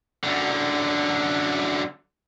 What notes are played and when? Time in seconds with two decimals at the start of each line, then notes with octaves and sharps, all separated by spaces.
0.24 F#2 D3